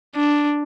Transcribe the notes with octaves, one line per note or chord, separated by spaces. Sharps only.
D4